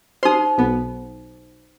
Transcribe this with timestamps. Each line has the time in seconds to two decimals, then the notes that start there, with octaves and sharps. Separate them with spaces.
0.23 D#4 C5 C6 D#6
0.58 B1 B3